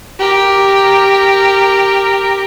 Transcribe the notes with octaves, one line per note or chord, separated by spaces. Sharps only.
G4 A#4